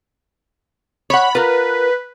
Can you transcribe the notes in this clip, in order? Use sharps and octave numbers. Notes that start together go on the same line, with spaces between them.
C#5 F#5 B5
F4 A#4 B4